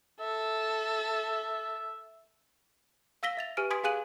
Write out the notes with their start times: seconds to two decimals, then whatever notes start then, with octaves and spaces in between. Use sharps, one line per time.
0.20 A4 E5
3.23 F5 E6 A#6 B6 G7
3.37 E5 A6 F7
3.57 G4 B4 G#5 F6 D7
3.70 G#5 C6 D#6 G#6 B6 D7
3.84 G#4 F5 G#5 F#6 D#7 F#7